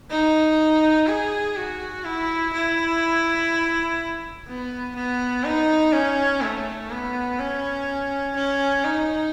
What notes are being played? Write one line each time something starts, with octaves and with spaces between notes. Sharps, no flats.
D#4
G#4
F#4
E4
E4
B3
B3
D#4
C#4
A3
B3
C#4
C#4
D#4